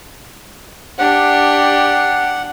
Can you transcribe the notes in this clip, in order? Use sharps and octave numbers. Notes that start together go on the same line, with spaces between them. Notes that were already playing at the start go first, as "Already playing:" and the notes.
D4 G4 F#5